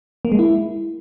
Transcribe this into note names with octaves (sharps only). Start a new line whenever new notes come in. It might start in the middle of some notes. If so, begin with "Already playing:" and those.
A#3
G#3
E4